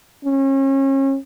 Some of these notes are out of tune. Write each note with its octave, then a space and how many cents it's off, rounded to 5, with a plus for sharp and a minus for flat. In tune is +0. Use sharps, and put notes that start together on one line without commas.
C#4 -35